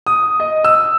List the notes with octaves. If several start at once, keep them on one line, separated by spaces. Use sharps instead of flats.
D#6
D#5
E6